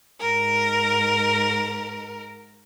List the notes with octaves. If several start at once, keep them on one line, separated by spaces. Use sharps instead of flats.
G#2 A#4